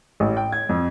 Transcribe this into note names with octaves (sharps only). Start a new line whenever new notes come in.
A1
G5
G#6
F2